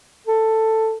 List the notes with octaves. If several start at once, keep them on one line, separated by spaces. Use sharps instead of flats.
A4